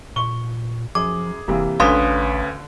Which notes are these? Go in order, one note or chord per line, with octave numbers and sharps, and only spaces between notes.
A#2 C#6 G7
F#2 F3 G#4 D6
F1 C3 E3 A#3
A1 D2 D3 C#4 B4 F5 C6 D#6